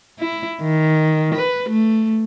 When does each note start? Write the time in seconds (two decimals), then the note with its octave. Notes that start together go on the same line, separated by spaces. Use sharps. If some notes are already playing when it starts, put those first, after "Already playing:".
0.19 E4
0.62 D#3
1.35 B4
1.69 A3